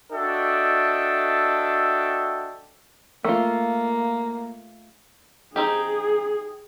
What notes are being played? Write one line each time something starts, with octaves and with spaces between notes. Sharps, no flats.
D4 F#4 A4 D#5 E5 G5
A3 A#3 F4
C4 D#4 G4 G#4